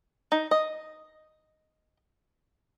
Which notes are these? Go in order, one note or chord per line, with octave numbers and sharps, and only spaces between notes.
D#4
D#5